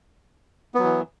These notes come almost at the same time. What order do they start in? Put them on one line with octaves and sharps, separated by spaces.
B3 F#3 E3